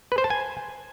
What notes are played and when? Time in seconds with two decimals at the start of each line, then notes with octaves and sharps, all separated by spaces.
0.12 B4
0.18 C5
0.24 A5
0.30 G#5